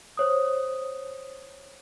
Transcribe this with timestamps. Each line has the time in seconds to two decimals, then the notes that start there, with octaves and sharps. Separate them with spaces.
0.17 C5 C#5 D#6